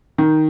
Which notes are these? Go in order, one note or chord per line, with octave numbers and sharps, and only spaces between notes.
D#3